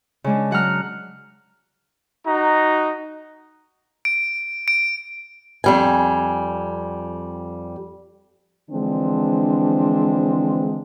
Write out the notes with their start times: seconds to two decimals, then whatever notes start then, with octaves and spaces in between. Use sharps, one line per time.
0.24 C#3 G#3 D4
0.51 F#3 F#5 A#5 F6
2.26 D#4 F#4 A#5
4.05 D7
4.68 D7
5.64 F2 G3 G#5
8.71 D3 E3 F3 G#3 C4 D4